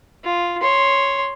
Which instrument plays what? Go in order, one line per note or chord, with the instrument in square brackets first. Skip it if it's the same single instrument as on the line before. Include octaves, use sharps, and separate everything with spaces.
[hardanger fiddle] F4
C#5 C6